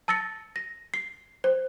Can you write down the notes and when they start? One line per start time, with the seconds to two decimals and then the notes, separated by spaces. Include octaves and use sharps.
0.08 A5 E6 A6 A#6 C#7
0.56 A#6
0.94 C7
1.44 C5